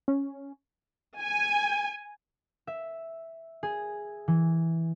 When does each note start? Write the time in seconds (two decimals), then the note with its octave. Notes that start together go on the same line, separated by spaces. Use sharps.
0.08 C#4
1.21 G#5
2.67 E5
3.63 G#4
4.28 E3